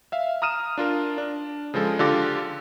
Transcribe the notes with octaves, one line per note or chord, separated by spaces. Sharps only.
E5 F5
A#5 D#6 F6 D#7 E7
D4 F4 A#4
D4
C#3 F3 G#3 A4
D3 F4 G4 A4 D6 A#6